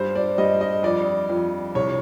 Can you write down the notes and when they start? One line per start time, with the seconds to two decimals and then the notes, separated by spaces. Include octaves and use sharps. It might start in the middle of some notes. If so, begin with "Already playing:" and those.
Already playing: G2 C5
0.15 D5
0.38 G2 D#5
0.61 D#5
0.83 F2 D5
1.29 F2
1.75 C2 C#5